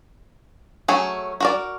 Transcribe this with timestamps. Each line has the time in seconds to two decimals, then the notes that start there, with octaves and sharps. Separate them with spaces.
0.88 F#3 A3 C#4 G#4
1.40 F#4 A#4 D5